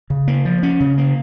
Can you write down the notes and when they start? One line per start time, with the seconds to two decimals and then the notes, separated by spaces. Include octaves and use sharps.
0.10 C#3
0.28 A#3
0.45 F3
0.63 C#4
0.80 C#3
0.98 A#3